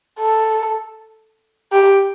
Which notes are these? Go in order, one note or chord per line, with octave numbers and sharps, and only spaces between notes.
A4
G4